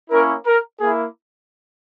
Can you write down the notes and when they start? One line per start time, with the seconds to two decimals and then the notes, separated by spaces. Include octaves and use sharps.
0.10 A#3 C#4 E4 A#4
0.46 A#4
0.79 A#3 E4 G#4